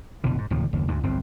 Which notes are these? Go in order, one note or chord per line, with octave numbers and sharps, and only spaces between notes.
F1 B2 D3 E3
G#2
D1 D#2 C3 F3
F#1 D#2
D2 G#2
G1 C2 F2 C4